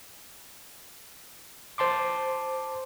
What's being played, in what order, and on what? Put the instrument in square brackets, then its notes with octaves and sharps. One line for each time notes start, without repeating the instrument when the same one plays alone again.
[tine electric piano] C5 A5 C6 D6